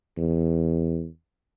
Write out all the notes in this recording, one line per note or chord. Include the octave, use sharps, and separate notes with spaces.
E2